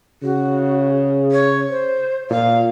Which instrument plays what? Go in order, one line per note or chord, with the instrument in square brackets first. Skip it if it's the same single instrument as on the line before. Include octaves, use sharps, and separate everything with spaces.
[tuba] C#3 [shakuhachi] F#4
[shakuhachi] C#5
C5
[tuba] A#2 [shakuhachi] F5